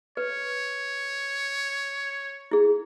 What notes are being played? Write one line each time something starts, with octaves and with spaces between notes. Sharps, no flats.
B4 C#5
E4 G#4